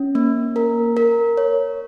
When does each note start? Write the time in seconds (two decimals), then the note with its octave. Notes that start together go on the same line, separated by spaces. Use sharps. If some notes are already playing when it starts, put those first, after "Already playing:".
Already playing: C#4
0.15 A#3
0.56 A#4
0.97 A#4
1.37 C#5